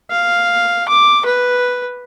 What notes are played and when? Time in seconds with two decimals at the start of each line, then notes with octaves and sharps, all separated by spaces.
0.11 F5
0.88 D6
1.25 B4